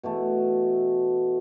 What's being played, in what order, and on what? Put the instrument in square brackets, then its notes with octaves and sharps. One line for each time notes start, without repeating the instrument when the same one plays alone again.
[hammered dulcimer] B2 E3 A3